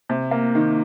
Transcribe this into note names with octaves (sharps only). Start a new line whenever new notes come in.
C3
A#3
D#3